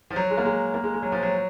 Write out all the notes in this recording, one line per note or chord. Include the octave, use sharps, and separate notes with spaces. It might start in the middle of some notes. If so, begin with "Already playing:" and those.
F3
F#3
G#3
A#3
G#3
A#3
G#3
G#3
F#3
F3
F#3